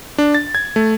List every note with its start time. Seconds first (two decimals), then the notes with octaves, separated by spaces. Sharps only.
0.18 D4
0.34 A6
0.55 G#6
0.76 A3